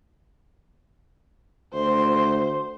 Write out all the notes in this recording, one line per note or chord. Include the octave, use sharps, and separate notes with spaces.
D2 C5